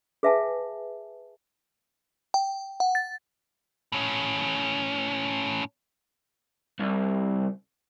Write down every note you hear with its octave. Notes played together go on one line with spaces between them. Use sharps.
G#4 B4 E5 F5 G#5 A5
G5
F#5
A6
A2 C#4
C2